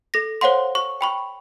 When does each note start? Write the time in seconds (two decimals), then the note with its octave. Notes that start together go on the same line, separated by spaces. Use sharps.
0.14 A4 A#6
0.41 C5 C#5 F5 F#5 C6
0.75 C#6
1.01 G5 B5 C#6